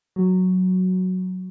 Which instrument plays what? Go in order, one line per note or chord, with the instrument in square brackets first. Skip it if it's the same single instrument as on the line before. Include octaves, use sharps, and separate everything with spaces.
[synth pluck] F#3